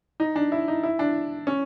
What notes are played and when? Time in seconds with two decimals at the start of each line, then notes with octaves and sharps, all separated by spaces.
0.20 D#4
0.36 D4
0.52 E4
0.68 D#4
0.83 E4
0.99 D4
1.47 C#4